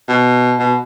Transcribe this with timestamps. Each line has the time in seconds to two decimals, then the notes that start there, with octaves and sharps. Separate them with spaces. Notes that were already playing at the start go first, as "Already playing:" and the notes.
0.09 B2
0.59 B2